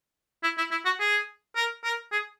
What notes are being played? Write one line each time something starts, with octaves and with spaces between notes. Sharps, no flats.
E4
E4
E4
F#4
G#4
A#4
A#4
G#4